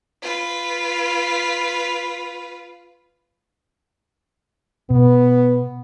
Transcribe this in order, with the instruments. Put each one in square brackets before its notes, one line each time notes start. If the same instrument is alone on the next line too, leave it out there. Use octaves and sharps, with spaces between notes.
[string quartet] F4 B4
[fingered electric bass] B2 [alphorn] B3